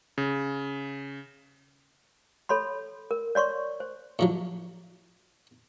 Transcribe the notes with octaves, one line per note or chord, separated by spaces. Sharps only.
C#3
A4 C#5 B5 C6
A#4
C#5 D5 C6 C#6
C5
A2 F3 F#3